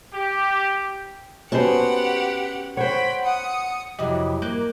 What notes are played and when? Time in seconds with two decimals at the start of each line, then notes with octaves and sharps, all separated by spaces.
0.13 G4
1.52 B3 C#4 F#4 G4 C5 F#5 A5
2.77 C5 C#5 F#5 G5 B5
3.26 F#5 D#6 C#7
3.99 F2 C3 F#3 E4 G4 D#5
4.42 A#3 D6 F#6 G6